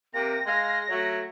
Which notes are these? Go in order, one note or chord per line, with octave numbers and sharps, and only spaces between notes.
C3 A#3 A#6
G#3 F5
F#3 A3 C#5